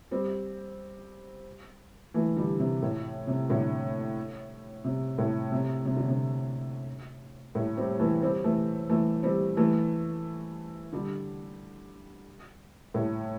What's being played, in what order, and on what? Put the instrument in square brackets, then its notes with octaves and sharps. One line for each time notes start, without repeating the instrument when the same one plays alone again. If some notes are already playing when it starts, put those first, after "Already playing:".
[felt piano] G3 C4
E3 A3
D3 G3
C3
A2
C3
A2 D3
C3
A2
C3
C3
D3
C3
A2
G3 C4
E3 A3
G3 C4
E3 A3
E3 A3
G3 C4
E3 A3
D3 G3
A2